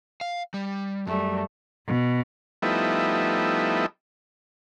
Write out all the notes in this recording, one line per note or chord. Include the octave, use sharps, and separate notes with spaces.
F5
G3
F#2 G3 A3
B2
F3 G3 A3 B3 D#4 E4